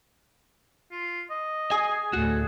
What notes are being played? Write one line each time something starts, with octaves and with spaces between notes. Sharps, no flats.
F4
D#5
G#4 G#5
D2 A2 F#4 A4